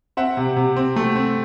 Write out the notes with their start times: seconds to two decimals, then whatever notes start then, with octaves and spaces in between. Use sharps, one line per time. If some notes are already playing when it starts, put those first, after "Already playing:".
0.17 C4 E5 F#5
0.37 C3
0.56 C3
0.76 C4
0.96 A3
1.16 C4